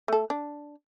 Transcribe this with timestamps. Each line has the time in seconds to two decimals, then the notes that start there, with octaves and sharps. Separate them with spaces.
0.08 A3 A4
0.30 D4